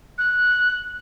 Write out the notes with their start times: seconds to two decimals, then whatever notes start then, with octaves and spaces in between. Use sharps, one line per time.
0.18 F#6